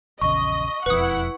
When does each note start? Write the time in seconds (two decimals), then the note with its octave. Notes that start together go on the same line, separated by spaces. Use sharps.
0.21 A#1 E2 C#3 D#5 C#6
0.86 E1 F2 E4 B4 F#5 D#6